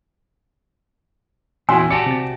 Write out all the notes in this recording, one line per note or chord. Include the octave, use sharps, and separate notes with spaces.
E2 A#2 C#4 E4 F#4 G#5 C6 E6
F#4 G4 D5 A5 C#7
C3 A6